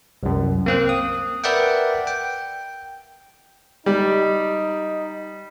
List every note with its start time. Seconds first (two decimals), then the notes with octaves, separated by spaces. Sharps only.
0.23 C2 F#2
0.66 A#3 C4 F#6
0.89 D#6
1.44 A#4 B4 D5 E5 F#5 G5
2.07 G5
3.86 G3 D#4